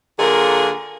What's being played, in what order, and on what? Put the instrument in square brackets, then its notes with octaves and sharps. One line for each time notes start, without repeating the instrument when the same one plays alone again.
[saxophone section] D3 F#3 A#3 F4 G#4 A#4